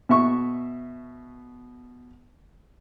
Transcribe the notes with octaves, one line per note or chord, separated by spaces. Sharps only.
B2 E5 C#6